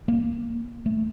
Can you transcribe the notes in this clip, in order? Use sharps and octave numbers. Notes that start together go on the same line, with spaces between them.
A#3
A3